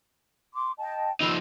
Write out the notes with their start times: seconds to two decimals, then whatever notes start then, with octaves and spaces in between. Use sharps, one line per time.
0.54 C6 D6
0.79 D#5 G5 A5
1.21 F3 D#4 B5 E6